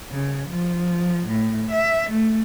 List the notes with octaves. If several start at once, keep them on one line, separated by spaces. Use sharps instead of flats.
C#3
F3
A2
E5
A3